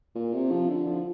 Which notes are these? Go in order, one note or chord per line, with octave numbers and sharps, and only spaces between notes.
A#2
C3
F3
D3
F3